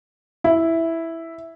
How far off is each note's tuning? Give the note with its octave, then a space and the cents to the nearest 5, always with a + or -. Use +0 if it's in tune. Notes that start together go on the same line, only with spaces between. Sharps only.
E4 +0